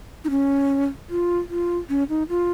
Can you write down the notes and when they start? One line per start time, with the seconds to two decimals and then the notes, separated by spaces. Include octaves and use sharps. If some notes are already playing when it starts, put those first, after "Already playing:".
0.25 D#4
0.30 C#4
1.10 F4
1.50 F4
1.89 C#4
2.09 D#4
2.29 F4